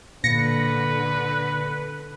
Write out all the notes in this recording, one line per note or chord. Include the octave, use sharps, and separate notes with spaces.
A#2 D3 B4 A#6 C#7